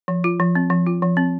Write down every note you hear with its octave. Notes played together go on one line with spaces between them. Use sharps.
F3
F4
F3
C4
F3
F4
F3
C4